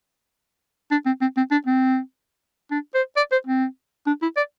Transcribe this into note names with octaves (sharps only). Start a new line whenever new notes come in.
D4
C4
C4
C4
D4
C4
D4
C5
D5
C5
C4
D4
E4
D5